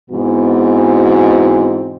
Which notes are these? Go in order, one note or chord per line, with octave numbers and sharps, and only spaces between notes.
G#2 B2 E3 B3 C4 F#4